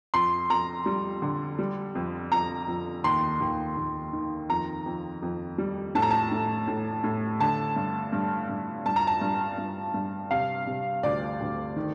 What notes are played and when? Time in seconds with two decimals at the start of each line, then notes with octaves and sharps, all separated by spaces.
0.14 F2 C6
0.50 F2 A#5
0.86 G3
1.22 D3
1.59 G3
1.95 F2
2.32 F2 A#5
2.68 F2
3.04 D#2 C6
3.40 D#2
3.77 D#2
4.13 D#3
4.50 F2 A#5
4.86 F2
5.22 F2
5.58 G3
5.95 A2 A5
6.02 A#5
6.11 A5
6.31 A2
6.67 A2
7.04 A2
7.40 D3 A5
7.76 G2
8.13 G2
8.49 G2
8.86 G2 A5
8.96 A#5
9.07 A5
9.21 G2
9.58 G2
9.94 G2
10.31 C3 F5
10.67 C3
11.03 D2 D5
11.40 D2
11.76 D#3